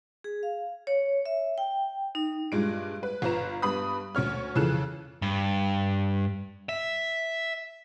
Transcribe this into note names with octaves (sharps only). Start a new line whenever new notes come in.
G#4
F5
C#5
E5
G5
D#4
G2 A#2 G#3 D7
B4
G1 F4 B4 A#5 E7
G2 B3 B5 D#6
D2 C#4 C#5 F6
F2 C#3 E3 A4 F#6 E7
G2
E5